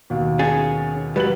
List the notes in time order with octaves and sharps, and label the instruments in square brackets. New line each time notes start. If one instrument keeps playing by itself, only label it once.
[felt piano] D#2 B2
[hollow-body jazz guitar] C#4 G#4 [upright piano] A6
[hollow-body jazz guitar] F#3 G3 [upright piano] B4 F#7